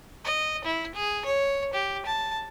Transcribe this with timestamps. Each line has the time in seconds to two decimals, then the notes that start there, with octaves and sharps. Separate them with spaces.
0.25 D#5
0.65 E4
0.95 G#4
1.25 C#5
1.74 G4
2.06 A5